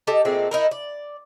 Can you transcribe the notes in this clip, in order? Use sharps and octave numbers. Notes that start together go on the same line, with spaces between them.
G4 A4 D#5 A5
A#2 G#3 A3 C4
D#4 E4 A#4
D5